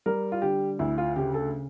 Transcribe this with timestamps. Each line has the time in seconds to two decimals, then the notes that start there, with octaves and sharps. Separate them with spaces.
0.06 G3 A#4
0.32 F4
0.42 D3 G4
0.79 D2 E4
0.98 F4
1.16 C#3 G4
1.34 A4